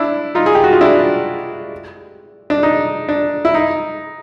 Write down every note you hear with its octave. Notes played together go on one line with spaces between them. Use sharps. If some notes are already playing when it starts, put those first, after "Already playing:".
Already playing: D4 E4
D#4 F4
G#4
G4
F#4
F4
D4 E4
D4
D#4
D4
E4
D#4